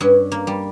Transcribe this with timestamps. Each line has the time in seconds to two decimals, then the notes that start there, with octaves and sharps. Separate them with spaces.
0.01 G2 C#4
0.32 A#3
0.47 G3